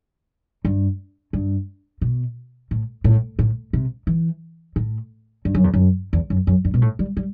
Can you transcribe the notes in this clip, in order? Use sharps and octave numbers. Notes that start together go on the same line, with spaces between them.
G2
G2
B2
A2
A2
A2
C3
E3
A2
G2
F#2
E2
F#2
E2
F#2
F#2
G2
B2
A2
G3
G3